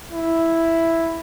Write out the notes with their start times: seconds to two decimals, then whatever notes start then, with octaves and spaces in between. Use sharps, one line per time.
0.13 E4